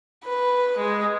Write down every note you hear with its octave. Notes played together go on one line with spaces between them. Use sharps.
B4
G#3